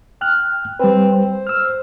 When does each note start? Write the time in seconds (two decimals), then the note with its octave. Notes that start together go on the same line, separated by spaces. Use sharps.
0.21 G5 F6 F#6
0.79 G3 C4 B4
1.14 C5
1.47 E6 F6